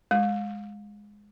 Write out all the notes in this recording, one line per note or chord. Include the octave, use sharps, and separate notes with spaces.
G#3